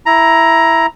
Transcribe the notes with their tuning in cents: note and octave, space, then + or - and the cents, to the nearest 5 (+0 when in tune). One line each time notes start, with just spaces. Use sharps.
E4 +5 A#5 +10